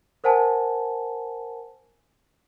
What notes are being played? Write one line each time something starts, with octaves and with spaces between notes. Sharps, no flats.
A#4 C5 F#5 G#5 A5